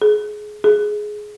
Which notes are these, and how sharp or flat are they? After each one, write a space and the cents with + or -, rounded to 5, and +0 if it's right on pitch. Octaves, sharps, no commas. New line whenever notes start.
G#4 +20
G#4 +10